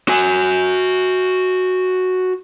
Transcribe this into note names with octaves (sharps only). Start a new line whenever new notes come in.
F#4 G#5